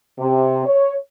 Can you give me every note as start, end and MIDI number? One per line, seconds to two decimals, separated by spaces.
0.19 0.65 48
0.66 0.95 73